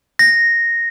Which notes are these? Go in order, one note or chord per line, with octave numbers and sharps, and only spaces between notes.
A#6